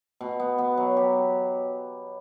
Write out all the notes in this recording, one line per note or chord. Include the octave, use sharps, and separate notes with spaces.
B2
B3
B3
F#3
G4